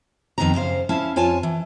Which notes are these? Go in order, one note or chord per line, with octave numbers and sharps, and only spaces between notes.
F2 D#3 B3 C4 D#4 A#5
F#2 C#3 C5 F5
C#4 E4 F5 A5
F2 F4 C#5 G#5 A5
E3